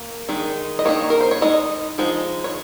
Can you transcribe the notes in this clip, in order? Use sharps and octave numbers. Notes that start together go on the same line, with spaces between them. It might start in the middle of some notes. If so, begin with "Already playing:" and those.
Already playing: A#3
D#3 G#3 D#4
D#5
D#3 A#3 D#4 C#5
A#4
C5
C#5
G#3 D#4 D#5
F3 G#3 D#4
C#5